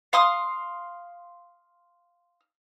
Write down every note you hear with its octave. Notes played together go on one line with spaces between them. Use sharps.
F5 C6 D#6